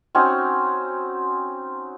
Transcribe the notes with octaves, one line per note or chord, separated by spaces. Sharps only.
C4 C#4 D#4 F#4